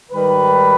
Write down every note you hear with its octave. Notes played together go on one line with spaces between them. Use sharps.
G#2 D#3 G3 B4